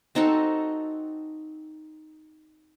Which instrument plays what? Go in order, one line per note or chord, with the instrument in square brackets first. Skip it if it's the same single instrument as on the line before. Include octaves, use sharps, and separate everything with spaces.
[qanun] C4 D#4 F#4 A4